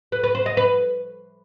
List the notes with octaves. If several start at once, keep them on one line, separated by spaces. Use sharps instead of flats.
B4
B4
C5
D#5
B4